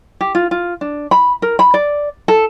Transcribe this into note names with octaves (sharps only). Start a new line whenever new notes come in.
G4
F4
F4
D4
B5
A#4
B5
D5
A4